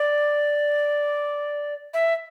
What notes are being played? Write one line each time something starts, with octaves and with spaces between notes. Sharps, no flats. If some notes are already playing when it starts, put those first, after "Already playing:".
Already playing: D5
E5